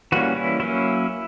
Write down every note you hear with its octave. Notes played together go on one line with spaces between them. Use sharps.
E3 G3 A#3 C#4 F#4
E4
F#3 A#3 C#4 E4